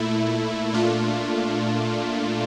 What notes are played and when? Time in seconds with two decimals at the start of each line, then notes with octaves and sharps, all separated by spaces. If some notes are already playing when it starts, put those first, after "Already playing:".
Already playing: A#2 A3 E4
0.73 A#2 A3 D4 F4